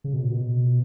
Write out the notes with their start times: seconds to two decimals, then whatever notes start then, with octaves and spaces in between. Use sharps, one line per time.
0.04 C#3
0.13 B2
0.22 A#2
0.31 B2